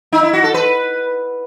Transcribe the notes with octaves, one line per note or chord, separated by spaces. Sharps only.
D#4
E4
F#4
A4
B4